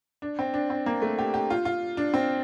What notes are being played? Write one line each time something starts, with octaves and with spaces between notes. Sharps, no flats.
D4
C4
D4
C4
A#3
A3
G4
G4
F4
F4
D4
C4